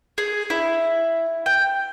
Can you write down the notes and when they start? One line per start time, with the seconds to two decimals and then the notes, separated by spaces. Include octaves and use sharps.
0.18 G#4
0.50 E4
1.46 G5